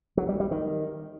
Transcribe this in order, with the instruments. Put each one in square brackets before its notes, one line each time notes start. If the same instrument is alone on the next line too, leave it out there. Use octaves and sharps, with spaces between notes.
[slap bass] F#3
G3
G3
D#3